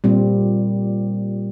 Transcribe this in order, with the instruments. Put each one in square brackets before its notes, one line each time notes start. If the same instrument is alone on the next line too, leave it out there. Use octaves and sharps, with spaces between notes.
[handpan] A#2 G3 C4